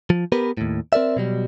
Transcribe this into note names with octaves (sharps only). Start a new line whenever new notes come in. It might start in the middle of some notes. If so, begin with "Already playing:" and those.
F3
B3 G4 A#4 B4
D#2 A2
C4 A#4 D5 E5
B2 F#3 G3